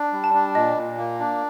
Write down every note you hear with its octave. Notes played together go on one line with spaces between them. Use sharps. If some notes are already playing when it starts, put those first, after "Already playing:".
Already playing: D4
G3
A5
D4
A#2 D#5
A#2
A#3
D4